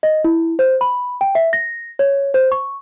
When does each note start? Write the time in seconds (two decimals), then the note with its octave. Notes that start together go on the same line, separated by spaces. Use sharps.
0.03 D#5
0.24 E4
0.59 C5
0.81 B5
1.21 G5
1.35 E5
1.53 A#6
1.99 C#5
2.34 C5
2.52 C#6